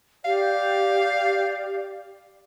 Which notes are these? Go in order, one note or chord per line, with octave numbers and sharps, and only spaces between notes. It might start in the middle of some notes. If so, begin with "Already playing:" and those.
G4 D5 F5